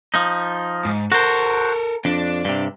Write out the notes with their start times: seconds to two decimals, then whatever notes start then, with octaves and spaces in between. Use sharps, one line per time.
0.14 F3 D#4
0.85 G#2
1.12 F#4 A4 A#4 C5
2.05 F2 D4
2.45 G2 C3